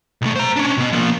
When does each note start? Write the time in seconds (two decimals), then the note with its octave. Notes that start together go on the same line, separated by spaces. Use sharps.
0.22 B1 A3
0.36 C5 A#5
0.56 C#4 D4
0.77 B2 B3
0.92 F3 A#3